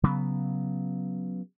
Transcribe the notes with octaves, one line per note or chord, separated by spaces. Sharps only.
C#3 F#3 B3